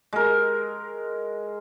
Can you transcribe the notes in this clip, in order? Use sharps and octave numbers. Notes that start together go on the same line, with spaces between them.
G#3 A#4